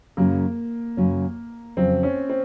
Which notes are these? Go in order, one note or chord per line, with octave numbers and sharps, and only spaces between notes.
F#2 C#3 F#3 A#3 C#4
F#2 C#3 F#3 C#4
F2 C#3 F#3 C4
C#4
C4